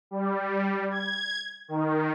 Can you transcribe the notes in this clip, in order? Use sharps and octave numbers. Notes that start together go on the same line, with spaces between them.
G3
G#6
D#3